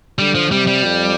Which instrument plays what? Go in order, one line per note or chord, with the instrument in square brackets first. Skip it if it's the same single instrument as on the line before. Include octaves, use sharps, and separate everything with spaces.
[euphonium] D3 [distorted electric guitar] G3
[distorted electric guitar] F3
[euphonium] C3 [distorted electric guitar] G3
[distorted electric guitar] G3
[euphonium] F2